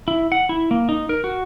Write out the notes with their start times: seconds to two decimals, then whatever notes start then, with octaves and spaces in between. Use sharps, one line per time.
0.08 E4
0.32 F#5
0.49 E4
0.71 A#3
0.89 D#4
1.09 A#4
1.24 F#4